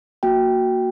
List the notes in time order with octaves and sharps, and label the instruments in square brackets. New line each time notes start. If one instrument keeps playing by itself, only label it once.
[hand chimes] A#3 F#4 G5